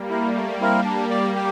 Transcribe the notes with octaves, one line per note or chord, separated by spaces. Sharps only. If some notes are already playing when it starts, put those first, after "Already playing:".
Already playing: G3 A#3
E4 A#4
A3
C4 E4 A#4 F5
D4
G4 D5
G4